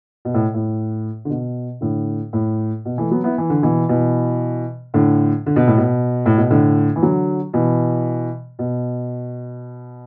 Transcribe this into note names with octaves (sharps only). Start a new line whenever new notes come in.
B2
A2
A2
D3
B2
A2 D3
A2
B2
E3 A3
F#3 B3
B3 E4
E3
D3
B2 E3
B2 E3
A2 D3
D3
B2
A2
B2
A2
B2
A2 D3
E3
D3 F#3
B2 E3
B2